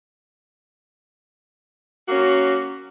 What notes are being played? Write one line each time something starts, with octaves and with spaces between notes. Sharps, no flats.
F#3 A#3 C#4 F#4